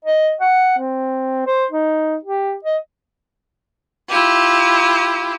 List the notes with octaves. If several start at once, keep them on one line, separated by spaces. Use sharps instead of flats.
D#5
F#5
C4
C5
D#4
G4
D#5
E4 F4 G4